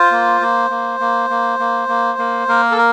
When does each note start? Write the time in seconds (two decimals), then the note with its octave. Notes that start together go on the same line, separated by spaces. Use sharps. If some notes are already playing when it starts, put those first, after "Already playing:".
Already playing: F4 C5
0.12 A#3
0.41 A#3
0.70 A#3
1.00 A#3
1.30 A#3
1.59 A#3
1.88 A#3
2.19 A#3
2.48 A#3 A#4
2.71 A4
2.77 A#4